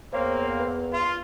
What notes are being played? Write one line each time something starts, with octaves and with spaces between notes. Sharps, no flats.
E2 A#3 C4 C5 C#5 F5
B4
F4